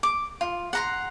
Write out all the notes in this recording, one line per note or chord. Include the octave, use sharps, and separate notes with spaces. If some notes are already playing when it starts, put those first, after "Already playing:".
D6
F4
F#5 A#5 C6